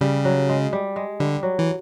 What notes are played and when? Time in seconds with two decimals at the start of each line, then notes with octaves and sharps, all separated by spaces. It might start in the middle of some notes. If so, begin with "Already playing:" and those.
0.01 C#3 G3
0.25 F#3
0.49 G#3
0.73 G3
0.96 G#3
1.20 D3 G3
1.43 F#3
1.59 E3